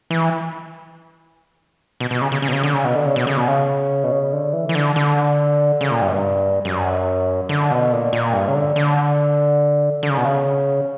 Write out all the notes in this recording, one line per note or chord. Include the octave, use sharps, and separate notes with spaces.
E3
B2
B2
C#3
C#3
C#3
B2
C#3
D3
C#3
B2
D3
C#3
B2
C#3
B2
C#3
B2
C#3
D3
E3
E3
D3
D3
C#3
A#2
G2
F#2
G2
F#2
D3
B2
A#2
A#2
G2
C#3
D3
D3
D3
C#3
B2
C#3